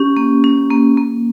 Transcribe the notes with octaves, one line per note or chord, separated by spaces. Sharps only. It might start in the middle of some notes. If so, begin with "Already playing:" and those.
Already playing: C#4 G4
A#3
C#4
A#3
A#3